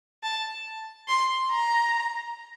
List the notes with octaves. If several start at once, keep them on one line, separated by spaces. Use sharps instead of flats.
A5
C6
A#5